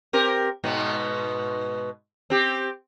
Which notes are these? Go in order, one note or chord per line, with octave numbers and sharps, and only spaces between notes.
C4 G4 A#4
G#2 B2 B3
C4 G4